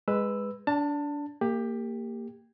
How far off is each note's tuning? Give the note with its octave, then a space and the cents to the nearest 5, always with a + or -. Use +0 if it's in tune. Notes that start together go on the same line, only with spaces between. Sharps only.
G#3 -10 B4 +0 E6 +0
D4 -25 A5 +20
A#3 -20 G4 +15